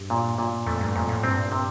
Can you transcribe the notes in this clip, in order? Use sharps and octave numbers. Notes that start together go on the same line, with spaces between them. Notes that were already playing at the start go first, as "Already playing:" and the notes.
Already playing: G2
A#2
A#2
F2 A3
G2
F2 A#2
A2
G2 C4
C3